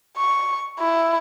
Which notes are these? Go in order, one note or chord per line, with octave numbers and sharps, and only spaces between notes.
C#6
E4